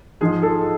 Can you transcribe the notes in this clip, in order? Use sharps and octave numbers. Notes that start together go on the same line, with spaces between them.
G#2 F3 G#3 G#4
A4